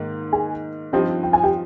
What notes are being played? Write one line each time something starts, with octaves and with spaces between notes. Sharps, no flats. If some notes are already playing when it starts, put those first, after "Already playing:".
Already playing: G#2 D#3 A#3
G#4 G#5
G2 F3 C4 D#4 G4 G5
G5
G#5
G4 G5